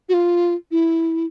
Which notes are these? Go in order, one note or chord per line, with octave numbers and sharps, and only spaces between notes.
F#4
F4
E4